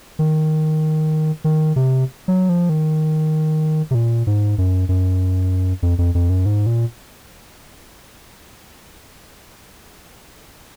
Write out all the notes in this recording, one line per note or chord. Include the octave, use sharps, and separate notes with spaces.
D#3
D#3
C3
F#3
F3
D#3
C3
A#2
G#2
F#2
F#2
F2
F2
F2
F#2
G#2
A#2